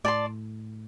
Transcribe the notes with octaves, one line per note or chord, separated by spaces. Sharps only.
A2 D5 A5 C6